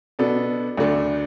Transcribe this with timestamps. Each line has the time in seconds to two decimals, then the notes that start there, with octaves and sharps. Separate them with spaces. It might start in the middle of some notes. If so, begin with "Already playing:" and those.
0.19 B2 B3 D4 A4
0.77 D2 D3 A3 D4